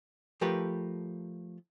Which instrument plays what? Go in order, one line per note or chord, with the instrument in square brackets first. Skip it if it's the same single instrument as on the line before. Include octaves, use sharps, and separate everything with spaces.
[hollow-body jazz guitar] F3 A3 G4 A#4 B4